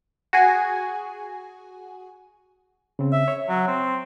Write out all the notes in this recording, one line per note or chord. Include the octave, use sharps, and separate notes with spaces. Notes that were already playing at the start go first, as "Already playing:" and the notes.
F#4 G#4 G#5
C#3 C4
E5
C#5
F#3
C4